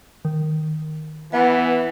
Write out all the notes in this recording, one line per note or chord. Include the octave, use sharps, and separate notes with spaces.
D#3
E3 B3 E5